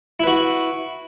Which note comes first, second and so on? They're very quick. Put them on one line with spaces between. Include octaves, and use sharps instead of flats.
E4 B4 F#4